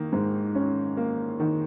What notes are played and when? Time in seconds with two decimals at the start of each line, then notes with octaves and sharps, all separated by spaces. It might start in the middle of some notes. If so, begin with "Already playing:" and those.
Already playing: D#3 A#3
0.13 G#2
0.55 C#4
0.97 A#3
1.40 D#3